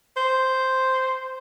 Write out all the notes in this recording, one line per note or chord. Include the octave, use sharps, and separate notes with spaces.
C5